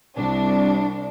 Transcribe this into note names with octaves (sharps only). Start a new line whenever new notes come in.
C2 D4